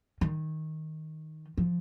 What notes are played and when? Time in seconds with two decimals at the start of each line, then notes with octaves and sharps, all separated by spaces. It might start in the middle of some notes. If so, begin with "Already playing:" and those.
0.21 D#3
1.57 F3